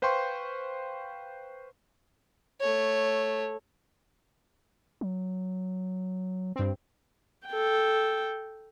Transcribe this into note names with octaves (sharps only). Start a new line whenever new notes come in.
B4 C5 F5 G5 C6 C#6
A3 C#5
F#3
G2 C4
A4 G5